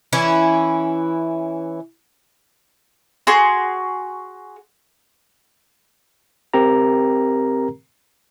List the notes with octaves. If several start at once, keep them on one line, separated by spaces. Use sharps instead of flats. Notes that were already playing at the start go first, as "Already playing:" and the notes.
E3 C#4 E4
F#4 G#4 C6
C4 G4 A#4 A#5